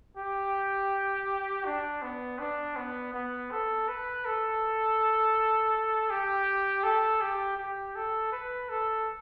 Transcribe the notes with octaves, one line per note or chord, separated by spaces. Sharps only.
G4
D4
B3
D4
B3
B3
A4
B4
A4
G4
A4
G4
G4
A4
B4
A4